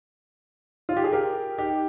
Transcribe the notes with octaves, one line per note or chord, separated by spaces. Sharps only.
F4
G4
G#4
G4 A#4
D#4 G4